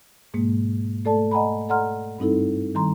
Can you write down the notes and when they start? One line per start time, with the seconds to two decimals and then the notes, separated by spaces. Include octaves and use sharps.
0.34 G#2 B2 G#3 A#3
1.05 A3 A4 D5 A5
1.31 D#5 F#5 G#5 A#5 B5
1.69 A4 D5 F#5 A#5 C6 F6
2.18 G2 G3 C4 D#4 E4 A4
2.75 D#3 G3 A#5 C6